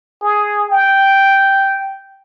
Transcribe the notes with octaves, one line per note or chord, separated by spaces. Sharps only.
G#4
G5